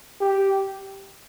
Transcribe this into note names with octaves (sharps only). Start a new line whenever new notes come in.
G4